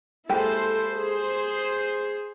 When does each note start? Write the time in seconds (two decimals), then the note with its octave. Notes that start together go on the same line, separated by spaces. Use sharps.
0.29 G#3 A#3 E4 G4 A4 C5
0.92 G#4 C5